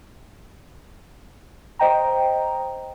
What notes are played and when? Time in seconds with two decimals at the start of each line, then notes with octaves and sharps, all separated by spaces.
1.79 C5 D#5 G5 A#5